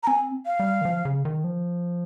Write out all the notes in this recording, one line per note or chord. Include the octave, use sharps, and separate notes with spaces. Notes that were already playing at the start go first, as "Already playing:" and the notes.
A#5
C4 G#5
F5
G3
D#3
F3
C#3
D#3
F3